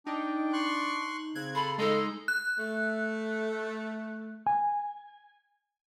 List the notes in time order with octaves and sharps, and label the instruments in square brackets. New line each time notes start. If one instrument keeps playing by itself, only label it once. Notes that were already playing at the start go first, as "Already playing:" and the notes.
[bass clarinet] D4 [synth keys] D#4 [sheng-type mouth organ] G5
[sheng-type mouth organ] C6 C#6 F#6
[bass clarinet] C#3 [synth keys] C4 F#6 G#6
[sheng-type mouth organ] A4 [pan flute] B5 [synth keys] C6
[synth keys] G#3 D#4 [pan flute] A4 [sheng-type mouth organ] A#5 C6
[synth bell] F#6
[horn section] A3
[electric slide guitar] G#5